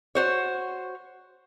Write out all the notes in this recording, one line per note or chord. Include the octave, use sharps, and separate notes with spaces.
F#4 C5 C#5